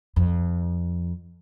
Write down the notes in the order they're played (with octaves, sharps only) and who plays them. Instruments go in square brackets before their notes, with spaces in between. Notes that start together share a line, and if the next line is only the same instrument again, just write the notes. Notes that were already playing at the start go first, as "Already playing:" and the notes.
[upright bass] F2